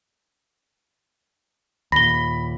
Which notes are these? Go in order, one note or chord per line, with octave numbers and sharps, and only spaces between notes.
D#2 A#2 B5 A#6 G7